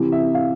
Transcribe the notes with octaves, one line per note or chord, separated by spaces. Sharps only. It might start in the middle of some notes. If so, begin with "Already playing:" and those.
Already playing: C3 E3
E5
F5